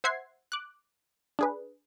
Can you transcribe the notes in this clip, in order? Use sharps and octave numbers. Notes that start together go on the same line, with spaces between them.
C5 E5 F#5 G#6 C7
D6 F#6
D4 G#4 B4